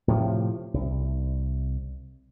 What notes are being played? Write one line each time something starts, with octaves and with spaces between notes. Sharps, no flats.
A2 C3 F3
C2